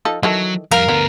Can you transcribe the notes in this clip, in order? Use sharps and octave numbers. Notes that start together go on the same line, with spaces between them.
F3 D#4 A4
D#3 E3 F#3 A4
F2 G3 A#4 F5
D2 D3 B3